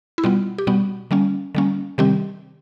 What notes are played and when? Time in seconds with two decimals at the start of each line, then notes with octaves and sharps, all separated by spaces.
0.18 E4
0.24 B2 G3 B3 F4
0.58 G4
0.67 B2 G3 B3 F#4
1.11 D3 G3 A#3 C#4
1.55 D3 G3 A#3 C#4
1.98 C3 D#3 G3 C4 G4